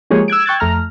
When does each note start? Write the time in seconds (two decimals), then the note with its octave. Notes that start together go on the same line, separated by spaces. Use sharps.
0.10 F3 G#3 A#3 G4 G#4 C#5
0.28 E6 F#6 G#6 D7
0.46 G5 C#6 E6 F#6 G#6 A6
0.60 F2 A3 A#5 F6